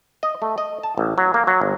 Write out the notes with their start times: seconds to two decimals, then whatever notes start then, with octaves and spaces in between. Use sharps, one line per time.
0.23 D#5
0.42 A3
0.58 D#5
0.83 A5
0.98 A1
1.18 F#3
1.34 A#3
1.47 F#3
1.61 G1